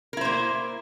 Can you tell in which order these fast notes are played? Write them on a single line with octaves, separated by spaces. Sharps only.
A#4 E4 C5 A#3